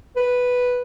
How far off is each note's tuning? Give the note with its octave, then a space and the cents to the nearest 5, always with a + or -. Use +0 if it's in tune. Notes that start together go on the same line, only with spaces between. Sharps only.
B4 +0